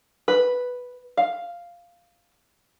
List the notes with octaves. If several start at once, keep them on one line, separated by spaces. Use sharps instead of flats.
B4
F5